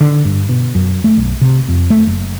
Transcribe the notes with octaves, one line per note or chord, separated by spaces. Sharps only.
D3
G2
B2
F#2
A3
B1
C3
F2
A3
F#1